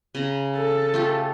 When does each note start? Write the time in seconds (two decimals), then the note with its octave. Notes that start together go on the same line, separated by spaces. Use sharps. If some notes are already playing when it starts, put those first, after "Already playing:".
0.15 C#3 A#5
0.55 A4
0.94 A3 F4 G4